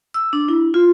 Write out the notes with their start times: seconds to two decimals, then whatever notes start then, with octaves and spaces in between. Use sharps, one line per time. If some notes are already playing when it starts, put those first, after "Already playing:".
0.14 E6
0.33 D4
0.49 E4
0.74 F4